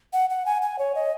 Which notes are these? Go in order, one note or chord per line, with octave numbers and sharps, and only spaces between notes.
F#5
F#5
G#5
G#5
C#5
D#5